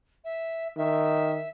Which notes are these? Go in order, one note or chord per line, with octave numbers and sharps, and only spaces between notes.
E5
D#3 E5